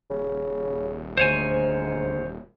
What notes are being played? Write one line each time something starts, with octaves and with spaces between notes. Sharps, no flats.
D#1 C#3
D2 G#2 C5 C#5 G#5